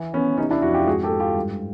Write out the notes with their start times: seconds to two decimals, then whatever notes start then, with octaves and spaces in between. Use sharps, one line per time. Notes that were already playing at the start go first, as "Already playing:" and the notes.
Already playing: E3
0.13 E3 B3 C#4
0.38 C3 C#4 D#4
0.51 D4 E4
0.62 F2 E4 F#4
0.74 F4 G4
0.87 G#2 F#4 G#4
1.03 G4 A4
1.11 G#2
1.20 F4 G4
1.35 G2